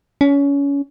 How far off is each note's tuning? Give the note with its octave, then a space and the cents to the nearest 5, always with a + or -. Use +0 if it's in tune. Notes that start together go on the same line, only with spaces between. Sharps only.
C#4 +25